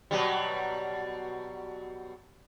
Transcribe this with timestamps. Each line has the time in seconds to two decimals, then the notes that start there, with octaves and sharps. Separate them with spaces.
0.11 B2 F#3 G3